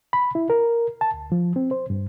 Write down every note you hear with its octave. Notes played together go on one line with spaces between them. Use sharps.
B5
E4
A#4
A5
D2
F3
C4
C5
G2